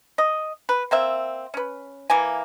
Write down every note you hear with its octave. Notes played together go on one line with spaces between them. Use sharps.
D#5
B4
A#3 C4 E5
C#4 B4
E3 A#3 G#5